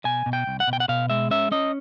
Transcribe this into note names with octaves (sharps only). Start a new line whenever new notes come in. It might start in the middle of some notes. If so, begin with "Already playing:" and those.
B2 G#5
B2
G5
C2
F#5
B2
G5
F#5
B2 F5
G#3 E5
C#4 E5
C#4 D#5